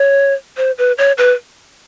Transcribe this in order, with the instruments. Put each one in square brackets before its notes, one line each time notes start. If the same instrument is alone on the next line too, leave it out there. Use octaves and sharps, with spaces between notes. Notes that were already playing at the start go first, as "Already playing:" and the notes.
Already playing: [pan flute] C#5
C5
B4
C#5
B4